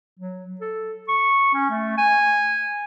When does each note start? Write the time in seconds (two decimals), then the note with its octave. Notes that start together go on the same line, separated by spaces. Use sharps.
0.19 F#3
0.61 A4
1.09 C#6
1.54 C#4
1.70 A3
1.98 G#5